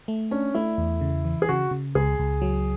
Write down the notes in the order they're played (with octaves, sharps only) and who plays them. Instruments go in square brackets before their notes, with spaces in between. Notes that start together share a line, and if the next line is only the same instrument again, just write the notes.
[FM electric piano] A3
[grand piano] C#4 [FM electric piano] D4
[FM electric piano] A3 [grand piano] E4
[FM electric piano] E2
C#3
E3
[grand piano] G#4
[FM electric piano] C#3 [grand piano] F#4
[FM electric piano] C#3
[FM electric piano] C#2 [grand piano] G#4
[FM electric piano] C#2
F#3